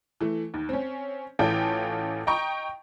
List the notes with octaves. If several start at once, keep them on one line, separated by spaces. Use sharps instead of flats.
E3 A3
D#2
C4 C#4
A1 E3 C#4 F4 A4 G5
D#5 G5 A#5 C#6